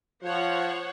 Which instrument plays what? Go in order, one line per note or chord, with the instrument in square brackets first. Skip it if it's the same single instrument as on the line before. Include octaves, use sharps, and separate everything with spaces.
[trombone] F3 [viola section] C5 C#5 F#5